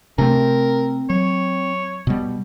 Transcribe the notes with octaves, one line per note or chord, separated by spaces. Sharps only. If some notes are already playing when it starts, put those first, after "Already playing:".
C3 A3 C4 C#4 A#4
F#3 C#5
B2 G3